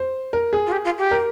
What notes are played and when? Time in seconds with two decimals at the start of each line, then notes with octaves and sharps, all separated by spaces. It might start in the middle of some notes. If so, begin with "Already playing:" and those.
Already playing: C5
0.33 A#4
0.53 G#4
0.66 F4
0.72 G4
0.85 F4
0.98 G4
1.11 A#4